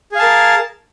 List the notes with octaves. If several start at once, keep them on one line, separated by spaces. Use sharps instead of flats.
G#4 A#4 F5 A5